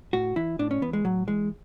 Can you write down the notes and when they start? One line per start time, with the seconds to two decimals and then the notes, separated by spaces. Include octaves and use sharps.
0.13 A2 F#4
0.36 E3 E4
0.59 A2 D4
0.71 C#4
0.82 E3 B3
0.93 G#3
1.05 A2 F#3
1.27 E3 G#3